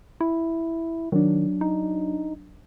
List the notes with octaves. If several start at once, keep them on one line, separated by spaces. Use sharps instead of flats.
E4
D#3 F#3 D4
D#4